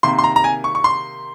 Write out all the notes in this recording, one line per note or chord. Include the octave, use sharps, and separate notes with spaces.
C3 D#3 A#3 C6
C6
A#5
A#5
G#5
C#6
C#6
C6